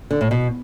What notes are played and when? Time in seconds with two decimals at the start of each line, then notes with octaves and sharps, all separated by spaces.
0.11 D3
0.21 A2
0.31 B2